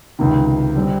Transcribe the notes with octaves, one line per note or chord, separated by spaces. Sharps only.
C#2 C3 D#3
D3 G3 C4